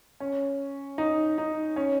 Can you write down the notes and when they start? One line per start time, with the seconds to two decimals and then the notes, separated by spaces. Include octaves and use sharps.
0.20 C#4
0.98 D#4
1.38 D#4
1.76 C#4